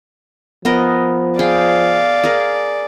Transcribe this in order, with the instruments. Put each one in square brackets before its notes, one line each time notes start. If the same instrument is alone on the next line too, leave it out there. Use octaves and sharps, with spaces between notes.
[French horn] F3 [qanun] B3 A#4 D#5
[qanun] G#4 G5 [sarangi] D5 [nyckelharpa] F5
[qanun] G#4 A#4